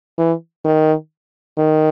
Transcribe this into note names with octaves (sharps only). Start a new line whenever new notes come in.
E3
D#3
D#3